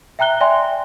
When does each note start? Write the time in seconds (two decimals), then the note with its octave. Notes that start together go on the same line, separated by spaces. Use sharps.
0.19 E5 G5 A#5 F#6 G7
0.41 D5 E5 G5 G#5 C6